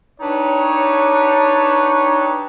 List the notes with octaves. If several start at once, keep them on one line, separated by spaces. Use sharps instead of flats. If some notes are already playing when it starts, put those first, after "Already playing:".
D4 D#4 G4 B4 C#5